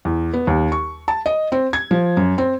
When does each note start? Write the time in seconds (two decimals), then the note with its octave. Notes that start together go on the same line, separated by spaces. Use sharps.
0.05 E2
0.33 B3
0.47 D#2
0.72 C#6
1.08 A5
1.26 D#5
1.52 C4
1.73 G#6
1.91 F3
2.17 F#2
2.38 C4